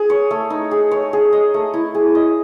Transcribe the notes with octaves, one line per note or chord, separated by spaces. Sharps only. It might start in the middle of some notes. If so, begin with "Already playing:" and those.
Already playing: G#4
C#5
A3
D#4
G#4
C#5
G#4
D#5
A3
E4
G#4
D#5